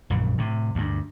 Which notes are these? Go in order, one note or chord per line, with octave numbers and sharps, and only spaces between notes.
A#1 F#2 A#2 C#3
A2 C3
D2 G2